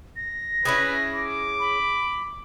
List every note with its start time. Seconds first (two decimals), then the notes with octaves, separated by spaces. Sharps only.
0.16 A#6
0.65 C#4 E4 G#4 B4
1.14 D6
1.60 B5